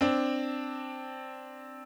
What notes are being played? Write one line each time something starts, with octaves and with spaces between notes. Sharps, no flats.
C4 D4